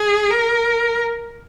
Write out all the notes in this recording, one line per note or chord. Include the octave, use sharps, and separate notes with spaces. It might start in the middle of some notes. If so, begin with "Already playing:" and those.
Already playing: G#4
A#4